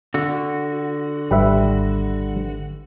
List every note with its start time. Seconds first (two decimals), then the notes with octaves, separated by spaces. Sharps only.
0.14 D3 F#4
1.31 G#1 G3 B4 E5